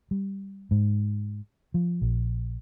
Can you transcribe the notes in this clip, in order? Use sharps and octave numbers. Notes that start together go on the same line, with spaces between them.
G3
G#2
F3
A#1